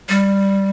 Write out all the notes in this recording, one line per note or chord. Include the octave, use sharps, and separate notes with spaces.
G3